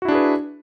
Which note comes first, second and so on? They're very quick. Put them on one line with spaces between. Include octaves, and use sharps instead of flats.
F#4 E4 D4 G#4 B4